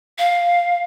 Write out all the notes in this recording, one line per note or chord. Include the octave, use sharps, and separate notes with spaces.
F5